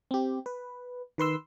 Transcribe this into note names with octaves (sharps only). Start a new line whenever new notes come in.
C4 G4
B4
D#3 B4 C6 E6